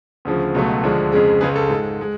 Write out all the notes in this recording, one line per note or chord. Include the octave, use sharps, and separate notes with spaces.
D2 C#3 F3
C#2 B2 F#3 A3
D2 D3 F3 G#3
F2 C#3 G#3
C#2 C#3 G#3 G#4 B4
A4
G#2 G#3
G#3